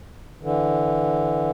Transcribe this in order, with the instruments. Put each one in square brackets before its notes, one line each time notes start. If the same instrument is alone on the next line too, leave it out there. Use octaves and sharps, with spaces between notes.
[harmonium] D3 E3